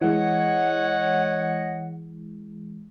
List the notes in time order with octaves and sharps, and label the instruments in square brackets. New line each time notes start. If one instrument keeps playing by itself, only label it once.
[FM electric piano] E3 G#3 [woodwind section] C#5 D#5 F#5